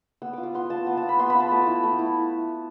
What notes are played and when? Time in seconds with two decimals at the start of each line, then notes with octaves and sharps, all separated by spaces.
0.22 B3 E6
0.33 F4 D6
0.43 D6
0.54 B3 C6
0.70 F4 A5
0.87 B3
0.97 A5
1.03 F4
1.09 B5
1.19 B3 C6
1.30 B5
1.35 F4 A5
1.51 A3
1.67 E4
1.83 A3
1.99 E4